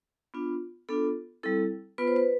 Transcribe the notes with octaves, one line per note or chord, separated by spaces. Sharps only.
B3 D4 F4
B3 D4 F4 A4
G3 C4 E4 A4
B3 F4 B4
C5
B4